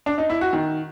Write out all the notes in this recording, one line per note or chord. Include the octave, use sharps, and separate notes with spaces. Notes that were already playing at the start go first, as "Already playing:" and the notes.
D4
D#4
E4
F#4
D#3